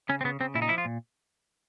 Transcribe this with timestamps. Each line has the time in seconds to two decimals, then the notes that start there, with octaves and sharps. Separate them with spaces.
0.09 C#3 C#4
0.21 C4
0.24 C#3 B3
0.40 C#3 C4
0.55 A#2 E4
0.62 D#4
0.69 F3 E4
0.78 F4
0.85 A#2